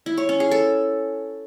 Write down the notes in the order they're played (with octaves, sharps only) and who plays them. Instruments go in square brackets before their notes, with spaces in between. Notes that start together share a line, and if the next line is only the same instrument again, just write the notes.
[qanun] E4
C#5
C#4
G#4
A4